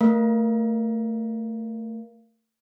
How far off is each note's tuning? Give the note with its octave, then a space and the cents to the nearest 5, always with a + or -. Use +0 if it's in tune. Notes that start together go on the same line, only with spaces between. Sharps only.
A3 +25 A#4 +20 F5 -25